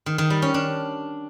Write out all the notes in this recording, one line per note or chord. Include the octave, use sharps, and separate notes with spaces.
D#3
D#3
G3
C#4
D4